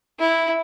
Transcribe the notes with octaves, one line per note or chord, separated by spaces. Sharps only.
E4